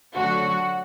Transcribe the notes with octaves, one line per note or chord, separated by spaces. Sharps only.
D3 F#3 A3 F#4